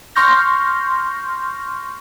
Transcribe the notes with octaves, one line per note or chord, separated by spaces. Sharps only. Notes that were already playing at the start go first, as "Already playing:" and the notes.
C6 C#6 F6 G6 A#6